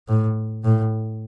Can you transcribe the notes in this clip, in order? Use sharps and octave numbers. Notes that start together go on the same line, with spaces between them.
A2
A2